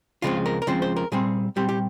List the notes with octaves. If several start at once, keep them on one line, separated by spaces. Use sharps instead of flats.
C#2 C#3 F3 G#3 C4 F4
A#4
A#4
C#2 C#3 F3 G#3 C4 C5
C5
A#4
A#2 G3 C4 G#4
A#2 G3 C4 G4
G4